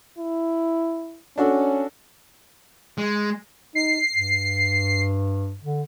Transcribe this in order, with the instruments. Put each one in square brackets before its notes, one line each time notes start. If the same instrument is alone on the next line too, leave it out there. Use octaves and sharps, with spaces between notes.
[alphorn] E4
[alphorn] C#4 [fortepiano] D4 F#4 A4
[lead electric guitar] G#3
[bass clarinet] D#4 [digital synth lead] C7
[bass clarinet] G2
D3